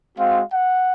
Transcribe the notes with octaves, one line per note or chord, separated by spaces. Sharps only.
G#3 C4 F#4 F5
F#5